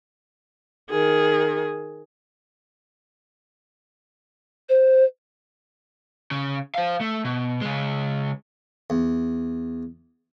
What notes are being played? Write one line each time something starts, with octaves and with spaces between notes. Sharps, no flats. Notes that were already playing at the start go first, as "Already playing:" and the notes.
D#3 G#4
C5
C#3
C5 F5
A3
B2
C#3 G#3
E2